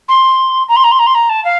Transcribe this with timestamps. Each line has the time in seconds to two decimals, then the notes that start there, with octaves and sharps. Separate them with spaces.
0.08 C6
0.68 A#5
0.76 C6
0.84 A#5
0.91 C6
0.99 A#5
1.06 C6
1.14 A#5
1.29 A5
1.44 F5